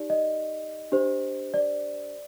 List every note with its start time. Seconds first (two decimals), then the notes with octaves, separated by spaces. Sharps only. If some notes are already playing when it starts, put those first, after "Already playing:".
Already playing: D#4 G4 D5
0.10 D#5
0.92 D4 G4 C5
1.54 D5